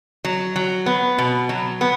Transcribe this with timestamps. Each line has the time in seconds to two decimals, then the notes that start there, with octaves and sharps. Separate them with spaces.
0.24 F#3
0.56 F#3
0.86 B3
1.18 B2
1.49 F#3
1.81 B3